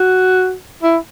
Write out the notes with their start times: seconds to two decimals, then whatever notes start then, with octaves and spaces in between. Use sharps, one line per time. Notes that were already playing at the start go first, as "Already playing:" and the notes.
Already playing: F#4
0.83 E4